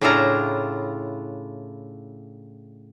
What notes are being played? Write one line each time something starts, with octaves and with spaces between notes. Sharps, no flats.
A2 C#3 D4 E4 F4 A#5